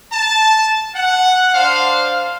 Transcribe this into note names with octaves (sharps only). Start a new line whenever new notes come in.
A5
F#5
D4 C5 F5